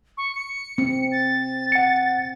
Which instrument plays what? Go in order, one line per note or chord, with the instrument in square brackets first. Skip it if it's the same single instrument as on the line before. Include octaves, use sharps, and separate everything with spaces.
[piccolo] C#6
C#7
[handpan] C4
[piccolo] A6
[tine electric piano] F#5 C#7